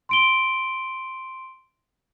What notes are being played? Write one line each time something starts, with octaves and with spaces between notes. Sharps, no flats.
C6 D7 G7